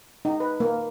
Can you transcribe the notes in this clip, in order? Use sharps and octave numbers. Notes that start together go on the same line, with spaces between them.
D#4
B4
A#3